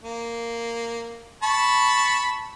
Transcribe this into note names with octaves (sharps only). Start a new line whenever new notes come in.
A#3
A5 B5 C#6